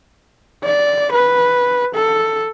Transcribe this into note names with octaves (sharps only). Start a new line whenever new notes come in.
D5
B4
A4